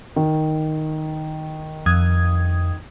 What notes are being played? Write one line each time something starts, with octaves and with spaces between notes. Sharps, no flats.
D#3
F2 D#6 G#6